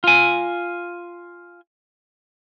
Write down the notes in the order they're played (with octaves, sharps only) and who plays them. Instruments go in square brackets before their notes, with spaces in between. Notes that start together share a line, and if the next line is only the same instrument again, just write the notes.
[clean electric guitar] F4 G#5